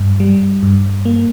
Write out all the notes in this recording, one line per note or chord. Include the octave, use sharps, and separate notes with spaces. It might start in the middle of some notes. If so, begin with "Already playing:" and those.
Already playing: G2
G3
G2
A#3